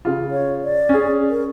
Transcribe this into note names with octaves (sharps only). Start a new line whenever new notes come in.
C#3 F4
C#5
D5
C#4 G#4
A#4